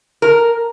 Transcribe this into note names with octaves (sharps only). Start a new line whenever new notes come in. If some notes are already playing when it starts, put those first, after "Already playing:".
A#4